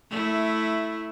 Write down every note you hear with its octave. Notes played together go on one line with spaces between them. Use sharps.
A3 E4